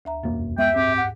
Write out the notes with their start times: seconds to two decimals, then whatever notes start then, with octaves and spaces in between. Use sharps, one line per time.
0.05 D2 E5 A#5
0.23 E1 F#2 A#3
0.58 G#3 B3 E5 G5
0.76 G#2 C4 G4
0.97 F#5